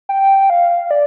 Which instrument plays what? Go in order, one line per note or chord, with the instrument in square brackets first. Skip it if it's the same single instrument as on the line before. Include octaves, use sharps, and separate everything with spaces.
[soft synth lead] G5
F5
D5